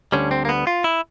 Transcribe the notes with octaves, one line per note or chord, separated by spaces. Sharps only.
D2 D3 G3 C#4
C4
A#3
B3
F4
E4